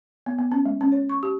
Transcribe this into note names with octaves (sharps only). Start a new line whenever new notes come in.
B3
B3
C#4
G#3
C#4
C#5
C#6
G4